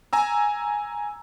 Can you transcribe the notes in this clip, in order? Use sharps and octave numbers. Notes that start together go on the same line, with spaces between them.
G#5 A#5 E6